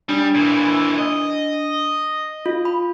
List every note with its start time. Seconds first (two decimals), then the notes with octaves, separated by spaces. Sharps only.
0.09 G3 D4
0.35 A#2 E3
0.98 D#5
2.46 F4
2.65 B5